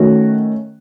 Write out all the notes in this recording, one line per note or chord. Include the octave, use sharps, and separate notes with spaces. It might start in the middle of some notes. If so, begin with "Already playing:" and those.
Already playing: D#3 A3 C#4 F#4